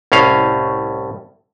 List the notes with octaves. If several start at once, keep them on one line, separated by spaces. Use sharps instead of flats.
C2 A2 C#4 F5